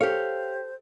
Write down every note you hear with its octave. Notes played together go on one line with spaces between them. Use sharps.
G4 A4 C5 C#5 F5